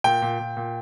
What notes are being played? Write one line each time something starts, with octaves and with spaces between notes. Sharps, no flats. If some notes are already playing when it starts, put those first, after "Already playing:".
A#2 G5
A#2
A#2
A#2